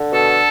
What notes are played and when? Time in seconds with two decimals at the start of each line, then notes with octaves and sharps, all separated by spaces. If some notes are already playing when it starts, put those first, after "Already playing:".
Already playing: D3
0.12 B2 A4